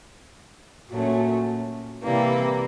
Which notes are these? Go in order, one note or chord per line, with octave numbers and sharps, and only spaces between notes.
A#2 F#3 A3 C#4
C3 E3 G3 A#3